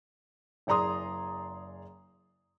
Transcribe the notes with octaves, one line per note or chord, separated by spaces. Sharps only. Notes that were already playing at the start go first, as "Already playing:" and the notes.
F#1 G#4 D5 A#5 C6 D#6